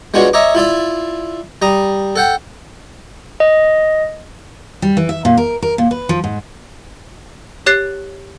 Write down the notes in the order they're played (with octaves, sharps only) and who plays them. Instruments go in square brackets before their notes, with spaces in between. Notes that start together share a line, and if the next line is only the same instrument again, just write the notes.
[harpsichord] G#3 B3 D4 F4 F#4 C#5
C#5 D#5 E5 A#5 D6
E4 F4 D5 E5
G3 A#5 D#6
A4 F#5 G5
[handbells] D#5
[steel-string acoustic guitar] G3
E3
E5
A#2
A#4
A#4
A#2
B4
F3
G#2
[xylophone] G4 C#5 F#6 A6 C7